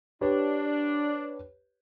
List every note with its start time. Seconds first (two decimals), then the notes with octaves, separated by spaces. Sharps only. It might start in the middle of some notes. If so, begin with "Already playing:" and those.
0.21 D4 G4 B4 C#5